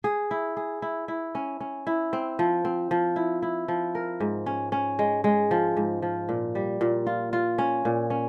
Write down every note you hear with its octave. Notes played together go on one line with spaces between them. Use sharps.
G#4
E4
G#4
E4
E4
C#4
C#4
E4
C4
F3
C4
F3
E4
E4
F3
A#4
G#2
C#4
C#4
G#3
G#3
F3
G#2
F3
A#2
G3
A#2
F4
F4
C#4
A#2
C#4